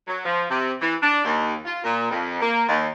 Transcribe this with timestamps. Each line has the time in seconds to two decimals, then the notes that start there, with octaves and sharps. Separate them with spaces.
0.07 F#3
0.25 F3
0.49 C3
0.80 E3
1.01 D4
1.24 D#2
1.65 F4
1.83 A#2
2.10 F2
2.40 A#3
2.67 D#2